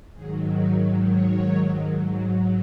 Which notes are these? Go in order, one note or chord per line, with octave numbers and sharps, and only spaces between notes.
G#2 D#3 F#3 G#4
F#4
C#5
G#2 F#3